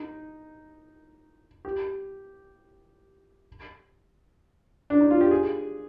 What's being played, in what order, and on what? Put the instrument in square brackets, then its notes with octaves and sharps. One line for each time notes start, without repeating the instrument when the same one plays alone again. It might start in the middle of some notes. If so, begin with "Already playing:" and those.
Already playing: [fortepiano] D#4
G4
D4
D#4
F4
G4
G#4